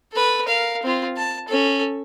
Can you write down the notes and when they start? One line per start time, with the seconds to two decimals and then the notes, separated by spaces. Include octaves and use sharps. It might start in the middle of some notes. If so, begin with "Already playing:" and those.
0.13 A4 B4
0.45 A#4 F5
0.83 C4 F4
1.17 A5
1.48 C#4 A4